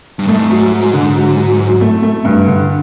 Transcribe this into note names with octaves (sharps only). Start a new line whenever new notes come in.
G2
G#2 A3
F#3
F#3
D3
F#3
F#3
F#3
A3
A3
G2
D3